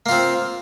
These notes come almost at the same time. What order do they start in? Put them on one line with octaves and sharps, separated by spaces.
A#3 F4 C4